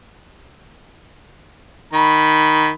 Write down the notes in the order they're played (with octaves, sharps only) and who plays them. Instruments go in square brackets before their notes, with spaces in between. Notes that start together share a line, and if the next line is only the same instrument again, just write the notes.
[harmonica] D#3 B5